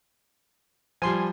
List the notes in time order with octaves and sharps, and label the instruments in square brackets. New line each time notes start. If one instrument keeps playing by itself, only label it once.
[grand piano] F3 G3 [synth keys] G#5 C6